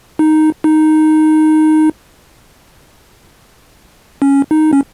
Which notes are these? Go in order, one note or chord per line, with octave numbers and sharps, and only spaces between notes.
D#4
D#4
C#4
D#4
C#4